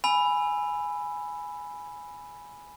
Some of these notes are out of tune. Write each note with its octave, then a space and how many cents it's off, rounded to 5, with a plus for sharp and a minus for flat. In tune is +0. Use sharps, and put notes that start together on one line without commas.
G#5 +0 B5 +0 E6 +15